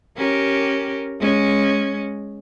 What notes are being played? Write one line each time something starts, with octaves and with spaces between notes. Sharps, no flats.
C#4 G4 A#4
G#3 C#4